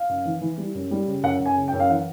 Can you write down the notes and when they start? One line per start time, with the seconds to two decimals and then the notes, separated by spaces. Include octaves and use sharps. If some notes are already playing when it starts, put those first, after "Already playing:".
Already playing: F5
0.09 F#2
0.25 E3
0.41 E3
0.58 G3
0.75 F#2
0.91 G3
1.07 C#3
1.23 F#2 F#5
1.40 F#2
1.46 G#5
1.57 C#3
1.68 G5
1.73 F#2
1.80 F5
1.90 E3 F#5